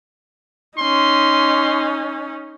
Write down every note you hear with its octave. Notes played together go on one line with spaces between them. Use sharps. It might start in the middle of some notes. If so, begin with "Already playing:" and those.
C#4 D#4 C6